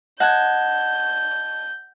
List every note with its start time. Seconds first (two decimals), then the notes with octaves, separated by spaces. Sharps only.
0.20 D#5 F#5 A5 G6 G#6